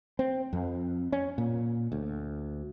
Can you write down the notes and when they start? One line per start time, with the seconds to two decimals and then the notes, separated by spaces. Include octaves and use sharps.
0.19 C4
0.53 F2
1.12 C#4
1.38 A#2
1.92 D2